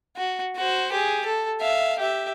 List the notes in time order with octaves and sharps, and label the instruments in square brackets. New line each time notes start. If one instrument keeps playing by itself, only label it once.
[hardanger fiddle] F#4
F#4 C5
G4 G#4
A4
E5 F5
G4 E5